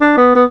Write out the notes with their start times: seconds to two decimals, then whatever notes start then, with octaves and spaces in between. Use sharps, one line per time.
0.01 D4
0.17 B3
0.35 B3